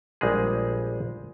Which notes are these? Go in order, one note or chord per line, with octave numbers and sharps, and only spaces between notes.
A#1 G3 G#3 G#4